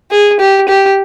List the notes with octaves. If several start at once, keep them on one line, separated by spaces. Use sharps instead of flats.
G#4
G4
G4